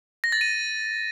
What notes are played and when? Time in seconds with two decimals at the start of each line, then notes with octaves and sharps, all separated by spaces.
0.24 A#6
0.32 A6
0.41 D#7